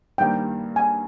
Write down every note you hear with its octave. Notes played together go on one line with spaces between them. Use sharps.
G2 D#3 G3 A#3 G5
G#5